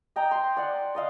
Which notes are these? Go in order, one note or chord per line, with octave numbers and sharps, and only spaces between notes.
D#5 G5 G#5 A#5
C6
D5 F#5
D5 D#5 F5